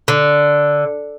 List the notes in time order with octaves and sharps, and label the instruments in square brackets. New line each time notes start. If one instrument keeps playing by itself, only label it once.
[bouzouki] D3